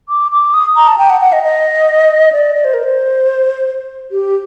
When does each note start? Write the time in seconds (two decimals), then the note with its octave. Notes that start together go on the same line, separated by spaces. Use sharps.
0.09 D6
0.32 D6
0.54 D#6
0.76 A#5
0.88 A5
0.98 G5
1.10 F#5
1.21 F#5
1.32 D#5
1.43 D#5
2.32 D5
2.55 D5
2.64 C5
2.74 A#4
2.83 C5
4.11 G4